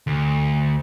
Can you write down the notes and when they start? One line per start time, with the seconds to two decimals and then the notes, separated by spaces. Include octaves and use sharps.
0.07 D2